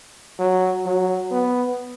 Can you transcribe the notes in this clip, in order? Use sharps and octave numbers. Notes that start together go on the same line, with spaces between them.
F#3
F#3
B3